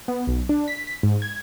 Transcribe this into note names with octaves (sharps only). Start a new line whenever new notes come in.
B3
B1
D4
B6
B6
G#2
G#6